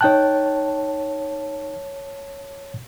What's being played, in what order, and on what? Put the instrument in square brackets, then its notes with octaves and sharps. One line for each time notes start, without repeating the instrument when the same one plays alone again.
[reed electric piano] D#4 G5 F#6 [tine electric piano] C#5 A5